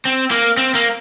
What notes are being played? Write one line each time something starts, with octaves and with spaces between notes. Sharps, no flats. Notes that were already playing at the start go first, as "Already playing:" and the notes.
C4
A#3
C4
A#3